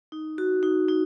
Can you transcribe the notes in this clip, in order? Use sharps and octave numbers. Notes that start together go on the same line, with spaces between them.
D#4
F#4
D#4
D#4